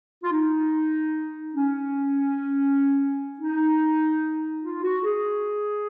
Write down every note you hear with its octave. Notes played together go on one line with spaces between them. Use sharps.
F4
D#4
C#4
D#4
F4
F#4
G#4